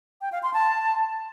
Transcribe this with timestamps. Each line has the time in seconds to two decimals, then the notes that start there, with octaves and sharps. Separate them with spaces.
0.21 G5
0.32 F5
0.43 C6
0.54 A5